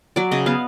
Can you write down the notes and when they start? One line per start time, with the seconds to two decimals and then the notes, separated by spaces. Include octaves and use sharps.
0.16 F#3 D5
0.31 C#3 D#5
0.46 B3 F5